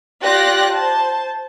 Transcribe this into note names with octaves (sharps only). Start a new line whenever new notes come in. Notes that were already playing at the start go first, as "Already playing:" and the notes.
F4 G4 D5 F#6 A#6
C5 A5